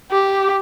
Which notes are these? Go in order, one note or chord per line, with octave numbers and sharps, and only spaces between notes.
G4